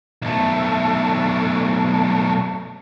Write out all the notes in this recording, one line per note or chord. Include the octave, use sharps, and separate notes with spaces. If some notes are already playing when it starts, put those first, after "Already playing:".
B1 A3